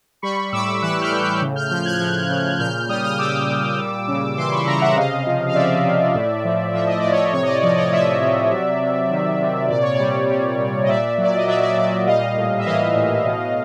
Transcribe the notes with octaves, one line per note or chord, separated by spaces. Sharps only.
G3 B5 C#6
A2 D6 E6
E3 E6 F#6
F6 G6
A2
F6 G6
C#3
F6 G6
F3 F6 G6
F#6 G#6
F3
C#3
A#2 F6 G6
G3 D#6 F6
D#6 F6
G3 D6 E6
A#2
G3
C#3
E3 C6 D6
B5 C#6
C#3 A#5 C6
E5 F#5
C3 D#5 F5
F3
F5
F3 D5 E5
C3
A2
F3
F3 E5
D#5
A2 D5
C#5 D#5
C3 C#5
D#5
D5
F3 D5
C#5 D#5
F3 D5 E5
C3
F#3
C3
D#3
C3
A#2 D5
C#5
D5
G3
G3
A#2
D#5
A#2 D5 E5
F#3
D5
D#5
F#3 D5 E5
D5 E5
A#2 D5 E5
G3 D#5 F5
A2
E5
E3 D#5 F5
A2
B2